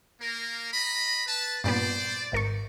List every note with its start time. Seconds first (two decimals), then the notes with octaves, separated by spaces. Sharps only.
0.21 A#3 A#4
0.72 D#5 A#5 B5
1.27 B4 A5
1.64 G2 A#2 B3 C5 D5
2.32 G#1 A#4 C#6